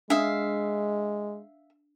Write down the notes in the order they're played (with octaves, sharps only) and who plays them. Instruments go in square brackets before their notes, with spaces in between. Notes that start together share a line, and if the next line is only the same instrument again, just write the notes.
[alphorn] G#3 [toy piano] D4 D#6 [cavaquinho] E5 F5